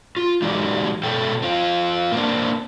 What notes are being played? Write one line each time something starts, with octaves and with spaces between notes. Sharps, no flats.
F4
E3 F#3 G#3 D#4 G4 D5
B2 A4 C#5 G5
C4 F4
A#3 C4 D4